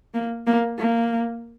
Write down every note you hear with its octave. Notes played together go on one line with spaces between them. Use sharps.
A#3
A#3
A#3